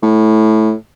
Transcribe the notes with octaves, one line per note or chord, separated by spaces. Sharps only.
A2